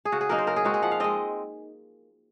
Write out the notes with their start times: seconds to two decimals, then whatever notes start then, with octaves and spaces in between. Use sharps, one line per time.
0.05 G#4
0.12 C#3 F#4
0.21 G#4
0.29 F#3 A#3 D#4 A#4
0.38 C5
0.47 C#3 A#4
0.56 G#4
0.64 G#3 C4 D#4 F#4
0.74 G#4
0.82 F3 F#5
0.91 F5
1.00 G#3 C4 D#5